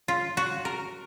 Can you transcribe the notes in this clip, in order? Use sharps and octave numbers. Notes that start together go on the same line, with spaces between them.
F4
F#4
A#4